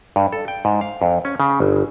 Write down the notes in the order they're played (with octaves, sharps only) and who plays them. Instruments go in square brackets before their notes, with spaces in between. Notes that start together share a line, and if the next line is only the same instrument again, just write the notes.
[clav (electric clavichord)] G2
A4
G5
G#2
F5
F2
C#4
C#3
G1